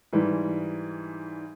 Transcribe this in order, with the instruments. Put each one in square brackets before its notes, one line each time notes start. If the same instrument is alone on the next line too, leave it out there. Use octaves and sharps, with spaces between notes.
[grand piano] G#2 E3 G3